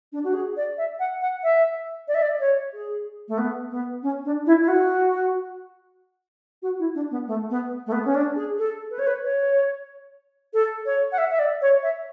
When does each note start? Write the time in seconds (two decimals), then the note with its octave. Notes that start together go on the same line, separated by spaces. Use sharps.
0.13 D4
0.24 F#4
0.34 G#4
0.57 D5
0.78 E5
0.99 F#5
1.21 F#5
1.43 E5
2.08 D5
2.15 E5
2.22 D5
2.40 C#5
2.73 G#4
3.28 A3
3.38 B3
3.70 B3
4.03 C#4
4.25 D4
4.46 E4
4.61 E4
4.68 F#4
6.62 F#4
6.79 E4
6.95 D4
7.11 B3
7.27 A3
7.50 B3
7.87 A3
7.92 B3
8.05 C#4
8.15 D4
8.36 G#4
8.58 A4
8.91 B4
8.99 C#5
9.07 B4
9.23 C#5
10.54 A4
10.86 C#5
11.12 F#5
11.18 E5
11.31 E5
11.39 D5
11.62 C#5
11.83 E5